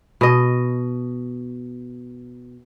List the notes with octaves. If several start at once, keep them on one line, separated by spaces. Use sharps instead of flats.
B2 D#5